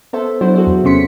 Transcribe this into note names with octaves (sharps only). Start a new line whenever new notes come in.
B3 A4 C5 E5
F#3 D4 E4 F#4 C5
F#4 G#4 A4 C5
E2
C3 B3 C#4 C6 B6 C#7